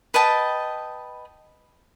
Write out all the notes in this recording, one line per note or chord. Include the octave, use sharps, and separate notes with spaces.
B4 D#5 G5 A5